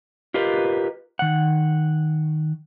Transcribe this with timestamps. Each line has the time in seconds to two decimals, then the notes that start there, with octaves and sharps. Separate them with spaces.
0.34 F4 G4 A#4 B4 D#5
1.19 D#3 F#5